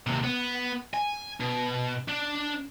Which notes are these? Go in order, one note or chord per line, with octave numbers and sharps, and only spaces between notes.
D#2 C3
B3
G#5
B2
D4